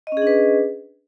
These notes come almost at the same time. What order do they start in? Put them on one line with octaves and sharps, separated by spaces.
D#5 C#4 G#4 D4 B4